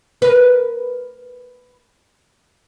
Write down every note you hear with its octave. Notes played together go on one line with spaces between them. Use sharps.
A#4 B4